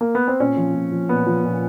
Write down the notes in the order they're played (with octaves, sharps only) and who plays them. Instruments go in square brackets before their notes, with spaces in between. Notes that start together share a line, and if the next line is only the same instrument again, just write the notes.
[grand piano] A#3
B3
C4
A#2 C#4
F3
A#2
F3
A#2 B3
F3
A#2